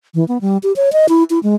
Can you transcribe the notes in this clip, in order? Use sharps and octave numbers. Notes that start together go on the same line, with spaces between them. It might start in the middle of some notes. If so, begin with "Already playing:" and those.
E3
B3
G3
G4
C#5
D#5
E4
E4
G#3